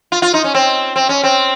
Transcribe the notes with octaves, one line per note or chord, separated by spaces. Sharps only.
F4
F4
D#4
C#4
C4
C4
C#4
C4